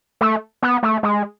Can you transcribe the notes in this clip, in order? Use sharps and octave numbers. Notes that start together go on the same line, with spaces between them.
A3
B3
A3
G#3